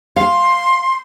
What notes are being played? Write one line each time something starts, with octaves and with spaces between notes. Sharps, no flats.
F5 C6